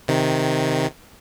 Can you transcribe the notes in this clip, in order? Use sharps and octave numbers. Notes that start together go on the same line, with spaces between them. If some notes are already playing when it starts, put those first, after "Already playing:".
C3 D#3